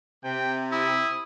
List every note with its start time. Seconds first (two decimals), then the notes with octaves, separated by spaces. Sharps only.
0.24 C3 G5
0.72 E4 D#6